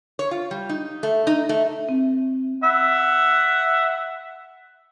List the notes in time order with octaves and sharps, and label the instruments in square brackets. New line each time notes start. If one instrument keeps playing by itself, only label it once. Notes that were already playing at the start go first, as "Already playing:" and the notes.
[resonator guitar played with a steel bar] C#5
F4
G3
D#4
A3
D#4
A3
[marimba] C4
[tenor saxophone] E5 [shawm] F#5